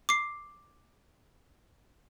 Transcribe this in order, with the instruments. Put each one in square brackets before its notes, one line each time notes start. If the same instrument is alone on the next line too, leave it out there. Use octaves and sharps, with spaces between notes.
[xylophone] D6 C7